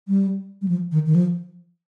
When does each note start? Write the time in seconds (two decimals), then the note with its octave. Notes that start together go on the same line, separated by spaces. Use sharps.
0.08 G3
0.62 G3
0.68 F3
0.92 D#3
1.06 D#3
1.15 F3